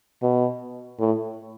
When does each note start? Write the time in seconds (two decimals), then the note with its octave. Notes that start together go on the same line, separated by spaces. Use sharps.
0.22 B2
1.00 A2